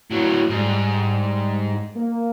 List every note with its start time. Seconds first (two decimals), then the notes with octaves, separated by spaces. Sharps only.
0.10 A2 F#3
0.50 G#2 G3
1.95 A#3